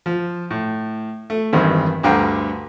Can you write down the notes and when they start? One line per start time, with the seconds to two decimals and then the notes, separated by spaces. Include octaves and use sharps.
0.06 F3
0.51 A2
1.30 A3
1.53 G#1 E2 G2 D#3 C4
2.03 D2 G2 D3 F5 G5 A#5